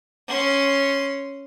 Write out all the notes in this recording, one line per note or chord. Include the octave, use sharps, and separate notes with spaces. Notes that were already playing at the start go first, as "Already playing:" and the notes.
C#4 C6